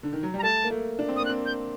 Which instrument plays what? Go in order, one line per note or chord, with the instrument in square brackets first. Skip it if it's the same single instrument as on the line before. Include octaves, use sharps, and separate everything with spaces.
[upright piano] D3
D#3
F#3
[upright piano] G3 [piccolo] A#5
[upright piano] A3 [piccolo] A5
[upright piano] A#3
A3
D4
C4
[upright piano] A#3 [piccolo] D#6
[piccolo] F#6
[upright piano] C4
[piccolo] G6